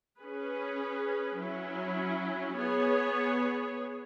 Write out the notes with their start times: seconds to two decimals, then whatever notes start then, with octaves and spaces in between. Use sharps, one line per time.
0.19 C#4 G#4 B4
1.38 F#3 C#4 E4
2.56 B3 G#4 C#5